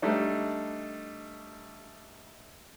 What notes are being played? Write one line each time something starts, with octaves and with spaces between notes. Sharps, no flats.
G3 A3 D4 D#4